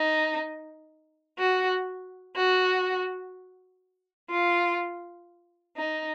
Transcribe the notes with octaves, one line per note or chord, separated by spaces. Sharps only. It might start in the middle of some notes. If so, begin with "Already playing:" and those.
Already playing: D#4
F#4
F#4
F4
D#4